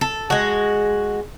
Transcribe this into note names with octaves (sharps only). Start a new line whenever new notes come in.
A4
G#3 F#4